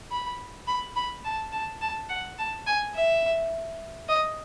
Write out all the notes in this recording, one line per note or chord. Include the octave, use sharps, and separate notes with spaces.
B5
B5
B5
A5
A5
A5
F#5
A5
G#5
E5
D#5